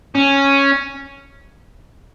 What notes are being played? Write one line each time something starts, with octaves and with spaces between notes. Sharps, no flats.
C#4